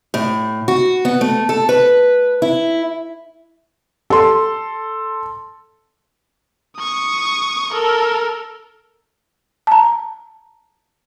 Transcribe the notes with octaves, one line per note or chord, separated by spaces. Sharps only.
A2
F#4
B3
A3
A4
B4
E4
A4 C6
C#6 D#6
A4 A#4
A5 A#5